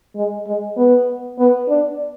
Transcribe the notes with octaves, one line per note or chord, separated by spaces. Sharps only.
G#3
G#3
B3
B3
D4